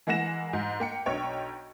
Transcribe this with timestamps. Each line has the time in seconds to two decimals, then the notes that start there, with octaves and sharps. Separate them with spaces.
0.07 E3 G#3 A#3 F#5 A#6 E7
0.53 G#2
0.80 A#3 G5 C#7
1.06 B1 D4 C#5 G5